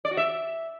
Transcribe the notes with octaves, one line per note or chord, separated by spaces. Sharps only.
D5
F#4
E5